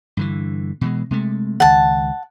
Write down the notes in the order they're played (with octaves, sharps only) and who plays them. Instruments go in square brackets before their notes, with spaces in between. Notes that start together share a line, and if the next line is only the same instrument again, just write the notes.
[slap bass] G2 D3 E3
B2 E3 G#3
C3 G#3 A3
[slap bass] C#2 D#3 [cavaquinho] F#5 A5